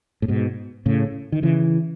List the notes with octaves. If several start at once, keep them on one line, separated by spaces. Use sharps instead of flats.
A2
G#2 B2
A2 C#3
D#3
C#3 E3